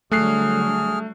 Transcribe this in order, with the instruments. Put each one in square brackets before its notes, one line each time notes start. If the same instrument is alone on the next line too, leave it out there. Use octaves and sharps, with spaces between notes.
[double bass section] D3 F#3 G3 [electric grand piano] A3 F#6 C7 [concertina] G#4 F6